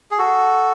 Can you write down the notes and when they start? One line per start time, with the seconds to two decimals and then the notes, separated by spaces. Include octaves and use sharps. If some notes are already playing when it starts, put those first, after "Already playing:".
0.11 G#4
0.18 F#4 A4